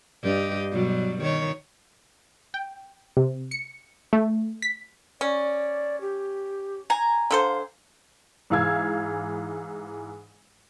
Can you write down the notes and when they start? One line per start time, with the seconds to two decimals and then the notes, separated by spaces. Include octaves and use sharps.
0.23 G2 G4 D#5
0.72 B2 F#3 G3
1.22 D#3 C#5
2.54 G5
3.17 C3
3.51 C#7
4.13 A3
4.62 B6
5.21 C#4 D5
6.01 G4
6.90 G#5 A#5
7.31 D3 A4 C5 F5
8.50 G#2 E3 F5 E6 G#6